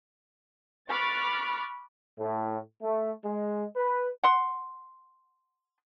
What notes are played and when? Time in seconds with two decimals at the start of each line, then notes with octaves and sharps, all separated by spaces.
0.89 B5 C#6 D6 F6 F#6 A6
2.19 A2
2.82 A3
3.24 G#3
3.76 B4
4.23 F#5 C6